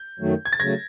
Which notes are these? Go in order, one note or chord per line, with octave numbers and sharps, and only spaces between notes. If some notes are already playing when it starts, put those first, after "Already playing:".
Already playing: G6
F#2 D#3 F#3 A3
G#6
A6
C#3 F#3 A3 G#6 A#6